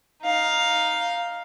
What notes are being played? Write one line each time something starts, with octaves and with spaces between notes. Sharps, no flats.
D#4 F5